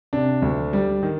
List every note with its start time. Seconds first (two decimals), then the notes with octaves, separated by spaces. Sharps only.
0.13 C3 D4
0.42 D2
0.73 G3
1.03 D#3